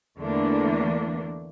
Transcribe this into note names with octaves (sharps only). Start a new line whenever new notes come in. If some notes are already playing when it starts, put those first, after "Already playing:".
E2 D3 E3 A3 A#3 D4